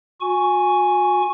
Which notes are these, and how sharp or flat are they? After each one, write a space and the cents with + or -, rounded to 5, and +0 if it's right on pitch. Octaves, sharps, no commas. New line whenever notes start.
F#4 -40 G#5 +0 C#6 +10